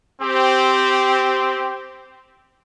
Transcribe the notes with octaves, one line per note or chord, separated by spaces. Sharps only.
C4 G4